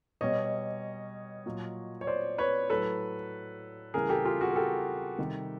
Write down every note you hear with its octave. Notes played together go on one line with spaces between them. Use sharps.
B2 G3 C#5 D#5
A#2 F#3
C#5
C5 D5
B4 C#5
A2 F#3 A4 B4
C#3 E3 G3 G#4 A#4
G4 A4
F4 G4
F#4 G#4
A#4
G4 A4
C3 D#3 G3